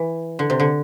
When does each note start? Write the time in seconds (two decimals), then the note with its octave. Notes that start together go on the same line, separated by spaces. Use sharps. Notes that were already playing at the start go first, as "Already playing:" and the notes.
Already playing: E3
0.39 D3
0.50 C3
0.60 D3